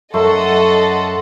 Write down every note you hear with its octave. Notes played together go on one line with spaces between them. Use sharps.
F#2 A3 A4 D#5 F#5 C6